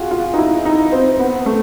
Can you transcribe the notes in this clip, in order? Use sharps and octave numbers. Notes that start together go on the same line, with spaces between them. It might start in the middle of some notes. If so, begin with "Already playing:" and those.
Already playing: F4 F#4 G#4
F4
D#4
E4
D#4
C4
B3
A3